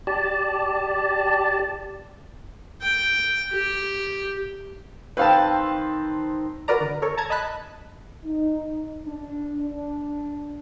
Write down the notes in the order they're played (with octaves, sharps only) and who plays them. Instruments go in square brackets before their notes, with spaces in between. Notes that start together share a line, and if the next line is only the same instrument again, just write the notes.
[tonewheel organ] G4 D5 A5
[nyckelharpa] G5
G4
[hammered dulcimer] D#3 C4 C5 [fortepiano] B4 F5 A5
[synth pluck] F#4 A#4 B4 D5 A#5
D3
A4 A#4 C#5
A5 A#5 G#6
D#5 A5 B5 F#6
[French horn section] D#4
D4
D4